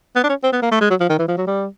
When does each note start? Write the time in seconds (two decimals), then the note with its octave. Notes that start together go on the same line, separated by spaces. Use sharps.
0.16 B3
0.24 D4
0.29 C#4
0.44 C4
0.53 B3
0.62 A#3
0.71 A3
0.81 G#3
0.90 F#3
1.00 F3
1.09 D#3
1.19 E3
1.28 F3
1.37 F#3
1.47 G3